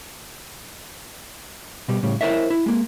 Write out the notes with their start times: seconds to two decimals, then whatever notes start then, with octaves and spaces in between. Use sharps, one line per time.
1.88 B2 G3
2.03 A2 C#3 G3
2.21 E4 A#4 C5 C#5 D#5 E5
2.50 E4
2.66 G#3 A#3